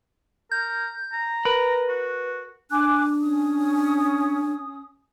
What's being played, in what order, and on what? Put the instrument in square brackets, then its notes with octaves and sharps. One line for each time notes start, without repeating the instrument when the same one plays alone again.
[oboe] A#4 [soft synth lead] G6
[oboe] A#5
[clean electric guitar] A#4 B5 [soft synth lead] B4
[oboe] F#4
[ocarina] D4 [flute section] G#5 D6 F#6
[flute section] C#4 D#6